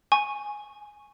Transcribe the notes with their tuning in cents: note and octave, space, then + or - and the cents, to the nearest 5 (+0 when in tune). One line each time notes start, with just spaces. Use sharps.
G#5 +0 C#6 -10